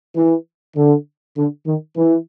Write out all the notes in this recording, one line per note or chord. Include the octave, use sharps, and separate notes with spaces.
E3
D3
D3
D#3
E3